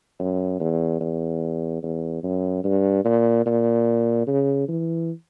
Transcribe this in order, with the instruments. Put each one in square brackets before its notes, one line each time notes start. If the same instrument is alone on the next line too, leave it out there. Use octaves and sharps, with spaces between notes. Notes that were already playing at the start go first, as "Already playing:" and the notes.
[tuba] F#2
E2
E2
E2
F#2
G2
A#2
A#2
C#3
E3